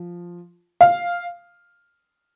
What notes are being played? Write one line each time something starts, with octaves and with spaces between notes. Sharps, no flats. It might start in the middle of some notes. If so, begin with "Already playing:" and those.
Already playing: F3
F5